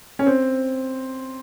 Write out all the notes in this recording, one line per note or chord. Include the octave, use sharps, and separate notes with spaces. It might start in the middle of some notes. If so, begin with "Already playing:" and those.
C#4
C4